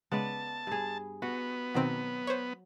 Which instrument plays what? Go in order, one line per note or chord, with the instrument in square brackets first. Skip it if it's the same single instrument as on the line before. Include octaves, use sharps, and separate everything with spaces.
[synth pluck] C#3 G#3 [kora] B3 B4 D5 [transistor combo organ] A5
[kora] G2 G#4
[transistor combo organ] B3 [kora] F#4
[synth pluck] B2 D#3 C4 [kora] F#3
[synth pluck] C5 C#5